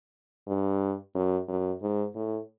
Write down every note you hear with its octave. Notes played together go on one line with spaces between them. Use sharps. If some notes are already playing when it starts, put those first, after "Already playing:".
G2
F#2
F#2
G#2
A2